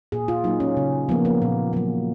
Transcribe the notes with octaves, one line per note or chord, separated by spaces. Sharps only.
A#2 G#4
F4
F#3 A#3 D#4
C#4
C#3
F3 A#3 B3
A#3
A#2
F#3 A#3